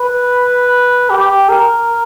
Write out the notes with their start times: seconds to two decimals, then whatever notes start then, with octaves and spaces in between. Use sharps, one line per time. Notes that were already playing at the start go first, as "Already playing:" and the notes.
Already playing: B4
1.10 G4
1.49 A#4